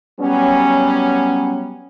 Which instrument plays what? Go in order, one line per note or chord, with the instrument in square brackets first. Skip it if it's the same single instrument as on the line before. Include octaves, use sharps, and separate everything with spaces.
[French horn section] F#3 G3 B3 C#4